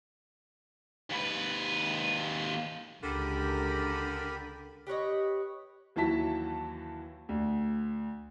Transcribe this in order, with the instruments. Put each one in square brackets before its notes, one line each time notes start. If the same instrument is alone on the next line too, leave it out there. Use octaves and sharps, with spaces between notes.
[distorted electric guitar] D#2 B4
[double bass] C#2 [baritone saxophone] D3 [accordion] G4 A#4 B5
[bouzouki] G4 B4 C#5 D#5
[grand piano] D#2 E3 F#3 E4 A5 B6
D2